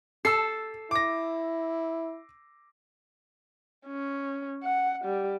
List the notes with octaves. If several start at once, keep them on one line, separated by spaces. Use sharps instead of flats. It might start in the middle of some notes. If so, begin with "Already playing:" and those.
A4 E6 C7
E4 D6 A#6
C#4
F#5
G3